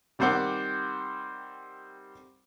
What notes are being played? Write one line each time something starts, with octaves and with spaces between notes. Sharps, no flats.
D#3 G3 C4 C5 F#5 D6